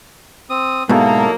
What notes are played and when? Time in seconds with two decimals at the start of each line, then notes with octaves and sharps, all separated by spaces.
0.50 C4 D#6
0.89 G#2 B2 F#3 A#3 D#4 E4 A4